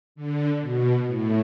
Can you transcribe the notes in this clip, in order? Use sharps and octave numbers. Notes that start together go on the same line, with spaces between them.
D3
B2
A2